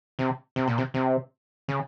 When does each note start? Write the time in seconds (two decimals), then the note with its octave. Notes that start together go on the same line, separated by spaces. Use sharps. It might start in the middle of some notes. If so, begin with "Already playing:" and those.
0.19 C3
0.56 C3
0.67 A#2
0.78 C3
0.94 C3
1.68 C#3